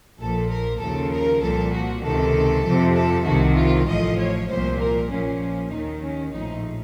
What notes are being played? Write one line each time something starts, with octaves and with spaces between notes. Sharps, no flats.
A#1 A#2 F3 A4
A#4
D#2 C#3 F3 A4
A#4
C2 A#2 F3 A4
F#4
C#2 C3 D#3 A4
F2 C3 F3
A4
C2 C3 D#3 F#4
F4
A1 A2 F3 D#5
C#5
C2 A#2 F3 C5
A#4
A#1 A#2 F3 C#4
D#2 D#3 D#4
C#4
A#1 A2 F3 D#4